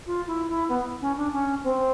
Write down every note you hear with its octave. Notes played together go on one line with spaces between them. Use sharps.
F4
E4
E4
B3
C#4
D4
C#4
C4